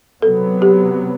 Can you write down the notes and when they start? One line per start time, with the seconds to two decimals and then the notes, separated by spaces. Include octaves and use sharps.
0.22 C3 F#3 B3 A4
0.62 G4